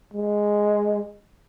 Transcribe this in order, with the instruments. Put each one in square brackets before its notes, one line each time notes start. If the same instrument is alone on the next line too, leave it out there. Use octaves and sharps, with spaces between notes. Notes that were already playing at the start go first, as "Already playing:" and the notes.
[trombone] G#3